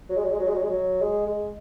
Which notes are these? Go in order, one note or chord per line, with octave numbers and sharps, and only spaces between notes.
F#3
G#3
F#3
G#3
F#3
G#3
F#3
G#3
F#3
G#3
G#3